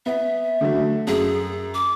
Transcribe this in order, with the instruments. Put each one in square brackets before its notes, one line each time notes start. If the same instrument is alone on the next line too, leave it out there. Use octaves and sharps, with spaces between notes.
[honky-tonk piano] B3 [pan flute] E5
[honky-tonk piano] D3 F#3 A3
[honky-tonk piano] F#2 [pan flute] G#4
[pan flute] D6